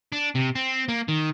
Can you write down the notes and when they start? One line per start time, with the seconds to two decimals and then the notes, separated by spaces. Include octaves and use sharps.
0.12 D4
0.35 C3
0.55 C4
0.88 A#3
1.08 D#3